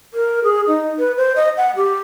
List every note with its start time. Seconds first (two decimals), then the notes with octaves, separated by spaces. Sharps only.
0.14 A#4
0.44 G#4
0.67 D#4
0.99 B4
1.17 C5
1.36 D#5
1.57 F#5
1.76 G4